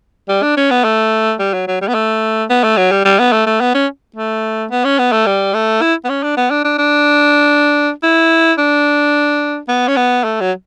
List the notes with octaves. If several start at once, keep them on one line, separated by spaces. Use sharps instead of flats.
G3
D4
C#4
B3
A3
G3
F#3
F#3
G3
B3
A3
B3
A3
F#3
G3
G3
B3
A3
A3
B3
C#4
A3
B3
C#4
B3
A3
G3
A3
E4
B3
C#4
D4
B3
D4
D4
D4
E4
D4
B3
C#4
B3
A3
F#3